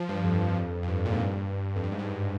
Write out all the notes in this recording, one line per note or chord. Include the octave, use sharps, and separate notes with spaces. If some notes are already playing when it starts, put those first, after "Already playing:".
Already playing: F3
G2
F2
F2
G2
A#2
G#2
G2
F2
G2
G#2
G2